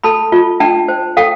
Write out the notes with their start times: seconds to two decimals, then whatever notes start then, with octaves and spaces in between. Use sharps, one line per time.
0.04 A4 A5 B5
0.32 F4
0.60 D4 G5 A5
0.88 C5
1.17 A4 F5 G5